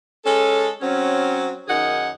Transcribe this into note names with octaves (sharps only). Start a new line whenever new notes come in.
G#3 C#4 A4
F#3 C4 C#4
F#2 D#3 D#4 G#4 F#5